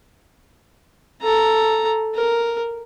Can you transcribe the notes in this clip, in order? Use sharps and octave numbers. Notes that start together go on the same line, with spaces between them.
A4 A#5
A#4